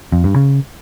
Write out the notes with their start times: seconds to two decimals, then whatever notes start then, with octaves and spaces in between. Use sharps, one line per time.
0.12 F2
0.24 G2
0.36 C#3